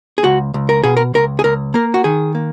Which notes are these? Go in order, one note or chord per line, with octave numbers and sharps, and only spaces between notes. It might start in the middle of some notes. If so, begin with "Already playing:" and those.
G#4
C#2 F#4
C#2
A#4
B2 G#4
A#4
C#2 A#4
G#4
C#2 A#4
A#3 A#4
F#4
D#3 G#4
A#3